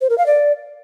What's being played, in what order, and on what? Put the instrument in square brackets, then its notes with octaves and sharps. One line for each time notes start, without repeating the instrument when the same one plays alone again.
[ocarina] C5
A#4
F5
D5